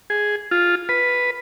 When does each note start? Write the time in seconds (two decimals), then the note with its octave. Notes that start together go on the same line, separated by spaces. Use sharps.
0.10 G#4
0.51 F4
0.89 B4